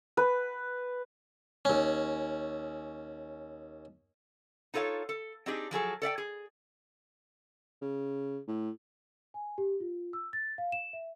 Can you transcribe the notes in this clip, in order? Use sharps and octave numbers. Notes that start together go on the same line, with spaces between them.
B4
D#2 C#4
D#4 F4 A4 C#5 F5
A4
C4 D4 D#4 G4 G#4
F3 F#3 G#4 A4
A4 D5 E5 G5
G#4
C#3
A2
G#5
G4
F4
E6
A6
F5
E7
E5